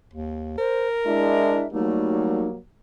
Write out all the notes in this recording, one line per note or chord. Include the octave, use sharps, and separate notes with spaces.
D#2
A#4 C5
G#3 D4 E4 E5
F#3 G3 A3 A#3 D#4